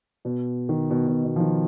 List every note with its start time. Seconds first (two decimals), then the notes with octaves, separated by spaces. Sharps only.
0.25 B2
0.69 D#3
0.90 B2
1.08 B2
1.24 B2
1.36 F3
1.40 D#3